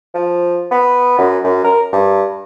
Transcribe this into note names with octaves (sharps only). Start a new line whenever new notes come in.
F3
B3
F#2
F#2
A#4
G2